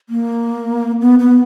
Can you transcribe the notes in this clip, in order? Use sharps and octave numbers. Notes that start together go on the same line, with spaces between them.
A#3
B3
B3